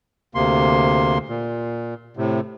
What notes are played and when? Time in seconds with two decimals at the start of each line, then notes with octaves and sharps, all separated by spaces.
0.35 D2 C3 A#3 C6
1.29 A#2
2.17 A2 C3